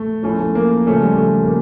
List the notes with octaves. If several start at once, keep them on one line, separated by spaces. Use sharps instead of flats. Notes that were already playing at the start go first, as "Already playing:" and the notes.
Already playing: A3
F3 A3 C#4 E4
A3
A#3
C#3 F3 A3 C#4
G3
A3
A#3